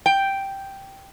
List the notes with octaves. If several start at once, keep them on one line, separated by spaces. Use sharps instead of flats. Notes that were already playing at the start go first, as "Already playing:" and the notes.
G5